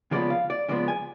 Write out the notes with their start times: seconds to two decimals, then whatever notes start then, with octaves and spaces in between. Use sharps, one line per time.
0.11 C#3 F3 G#3 B3 D5
0.30 F5
0.50 D5
0.68 C#3 F3 G#3 B3 D5
0.88 G#5